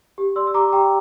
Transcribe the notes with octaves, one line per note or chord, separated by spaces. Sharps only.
G4
D5 C6 E6
E6
G4 A#5 D6
G4 G5 A#5